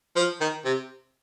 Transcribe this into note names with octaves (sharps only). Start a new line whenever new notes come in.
F3
D#3
C3